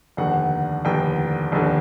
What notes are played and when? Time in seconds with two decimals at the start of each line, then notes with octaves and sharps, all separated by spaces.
0.17 F1 D#2 D3 F#5
0.85 F1 D#2 D3 G5
1.52 F1 D#2 D3